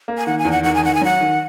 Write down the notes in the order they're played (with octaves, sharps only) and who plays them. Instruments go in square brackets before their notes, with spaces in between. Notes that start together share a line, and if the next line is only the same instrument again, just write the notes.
[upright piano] A#3
[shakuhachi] G#5
[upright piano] D#3 [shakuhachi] F#5
[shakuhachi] G#5
[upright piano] E2
[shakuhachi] F#5
[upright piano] D#3 [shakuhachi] F#5
[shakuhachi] G#5
[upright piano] D#3 [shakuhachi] F#5
[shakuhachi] G#5
[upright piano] F#3 [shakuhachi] F#5
[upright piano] D#3